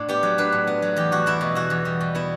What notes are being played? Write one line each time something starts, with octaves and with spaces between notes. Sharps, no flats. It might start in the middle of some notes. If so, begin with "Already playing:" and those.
Already playing: A2 D4
B3 G4
F#3
D4 B4
A2
B3
F#3
E2 G4
E2 F#4
G3 E4
B2
E2 F#4
E2
G3
B2
B3 E4